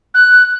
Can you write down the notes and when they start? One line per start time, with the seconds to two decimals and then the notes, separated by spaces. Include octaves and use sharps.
0.14 F#6